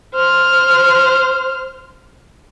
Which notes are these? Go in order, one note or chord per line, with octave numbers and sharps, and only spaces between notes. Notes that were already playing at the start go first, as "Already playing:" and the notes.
C5 F6